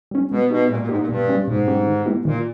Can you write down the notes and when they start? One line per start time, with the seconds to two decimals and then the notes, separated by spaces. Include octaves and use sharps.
0.11 G3 C#4
0.31 B2 G#3
0.50 B2 D#4 G4
0.70 A#2 G#3
0.80 A#2
0.89 G#2 D#4 G4
0.99 A#2
1.09 G2 B2
1.28 G3 C#4 G4
1.47 G#2 B2
1.67 G3 C#4 G4
1.87 D#3
2.06 G#3 B3 E4 G4
2.25 A#2 D#3